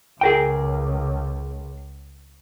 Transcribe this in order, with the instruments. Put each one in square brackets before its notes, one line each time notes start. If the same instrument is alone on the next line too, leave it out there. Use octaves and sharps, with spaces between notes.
[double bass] C#2 [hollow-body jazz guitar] G#4 A#4 G5